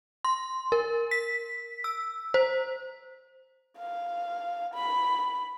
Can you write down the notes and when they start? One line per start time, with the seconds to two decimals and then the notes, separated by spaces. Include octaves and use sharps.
0.25 C6
0.72 A#4
1.11 B6
1.84 E6
2.34 C5
3.78 F5
4.74 B5